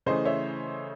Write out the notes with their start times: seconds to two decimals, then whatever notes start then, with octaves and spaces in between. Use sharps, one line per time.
0.06 C#3 E3 A3 C5 D#5
0.25 C#5 E5